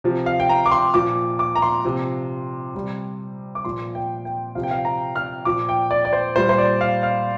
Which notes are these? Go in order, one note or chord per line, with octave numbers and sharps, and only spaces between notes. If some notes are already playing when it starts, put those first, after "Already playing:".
C3 F3
F5
G5
A#5
D6
C6
A#2 F3 D6
D6
A#5
C6
C3 F3
C3 G3
D6
A#2 F3 C6
G5
G5
C3 F3 F5
G5
F5
A#5
F6
A#2 F3 D6
G5
D5
D5
C5
A#2 G3 C5
C5
D5
F5
F5